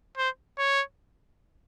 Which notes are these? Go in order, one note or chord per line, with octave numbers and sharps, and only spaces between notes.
C5
C#5